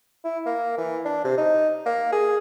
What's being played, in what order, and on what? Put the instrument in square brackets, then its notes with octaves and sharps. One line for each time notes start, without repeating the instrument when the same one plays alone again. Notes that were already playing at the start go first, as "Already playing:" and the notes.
[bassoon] E4
A#3
E3
D4
C3
D#4
A#3
G#4